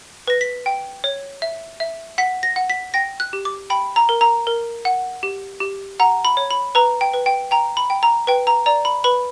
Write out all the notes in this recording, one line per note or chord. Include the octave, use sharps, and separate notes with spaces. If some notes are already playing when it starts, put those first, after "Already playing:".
B4 A#6
B6
G5
C#5
E5
E5
F#5 B6
A#6
F#5
B6
G5 A#6
F#6
G4
D6
G5 B5
A#5
A#4
A#5
A#4
F#5
G4
G4
F#5 A#5
B5
C#5
B5
B4 A#5
G5
B4
G5
G5 A#5
B5
G5
A#5
B4 G5
A#5
D5 A#5
B5
B4 B5